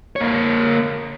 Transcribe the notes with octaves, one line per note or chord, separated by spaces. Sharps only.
A#3 C#5